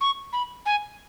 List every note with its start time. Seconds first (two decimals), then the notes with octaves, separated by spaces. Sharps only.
0.01 C#6
0.33 B5
0.66 G#5